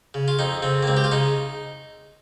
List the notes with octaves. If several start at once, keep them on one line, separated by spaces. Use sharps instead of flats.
C#3
F4
F2 D#4
C#3 C4
A#3
C#2 C4
G4
F4
C#3 D#4